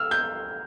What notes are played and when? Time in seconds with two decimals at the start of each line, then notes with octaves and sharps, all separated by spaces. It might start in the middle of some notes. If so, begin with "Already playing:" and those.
Already playing: E6 F6
0.11 G6